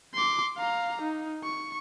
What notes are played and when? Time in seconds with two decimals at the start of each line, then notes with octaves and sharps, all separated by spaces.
0.14 C6 D6
0.57 F5 A#5
1.02 D#4
1.44 C#6